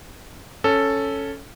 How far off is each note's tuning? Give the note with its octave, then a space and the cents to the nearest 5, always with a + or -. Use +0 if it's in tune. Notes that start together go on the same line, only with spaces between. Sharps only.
C#4 +0 A4 +0